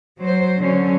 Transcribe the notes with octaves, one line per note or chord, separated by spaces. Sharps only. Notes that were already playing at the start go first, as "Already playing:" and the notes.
F#3 C5
D3 F#3 C#4